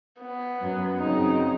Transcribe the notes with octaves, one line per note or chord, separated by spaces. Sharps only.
B3
F#2
F#2 C#3 C4 D#4